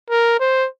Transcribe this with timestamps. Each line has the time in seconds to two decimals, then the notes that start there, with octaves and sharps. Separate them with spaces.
0.10 A#4
0.40 C5